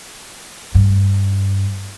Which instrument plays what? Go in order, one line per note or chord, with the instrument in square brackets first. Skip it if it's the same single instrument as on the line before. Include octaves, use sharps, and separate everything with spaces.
[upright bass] G2